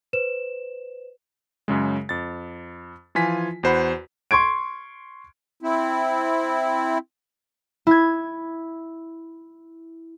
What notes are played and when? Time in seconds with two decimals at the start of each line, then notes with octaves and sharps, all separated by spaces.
0.13 B4 C5 E7
1.68 F#2 C#3 G#3
2.09 F2 A6
3.15 E3 F3 F4 G#5 B6
3.63 E2 F#4 C5 F#5 B5
4.31 C6 C#6 G#6 D7
5.63 C4 E4
7.87 E4 G#6